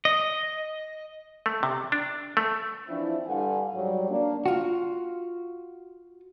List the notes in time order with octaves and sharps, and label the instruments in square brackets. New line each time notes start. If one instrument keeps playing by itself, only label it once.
[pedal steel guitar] D#5
[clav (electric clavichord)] A3
C3
D4
A3
[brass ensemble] E3 F3 C4 D4 E4
G2 D3 A4 F5 F#5 G#5
G#2 F#3 G3
A#3 D4
[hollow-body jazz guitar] F4 F#4